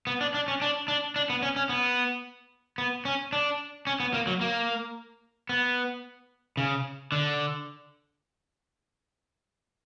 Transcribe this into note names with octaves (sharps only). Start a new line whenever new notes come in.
B3
D4
D4
C#4
D4
D4
D4
B3
C#4
C#4
B3
B3
C#4
D4
C#4
B3
A#3
F#3
A#3
B3
C#3
D3